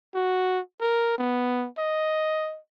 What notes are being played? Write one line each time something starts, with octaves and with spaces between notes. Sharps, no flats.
F#4
A#4
B3
D#5